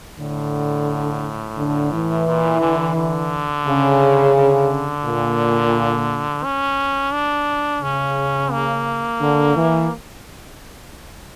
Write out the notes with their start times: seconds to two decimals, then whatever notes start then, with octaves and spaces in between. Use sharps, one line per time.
0.19 A2 D3
1.57 D3
1.93 E3
2.26 A#2
2.61 D3
2.96 D3
3.66 C#3
4.35 D3
5.05 A#2
6.44 C#4
7.13 D4
7.82 C#3 C#4
8.52 A#3
9.21 D3
9.55 E3